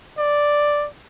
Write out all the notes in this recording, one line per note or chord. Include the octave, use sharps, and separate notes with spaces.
D5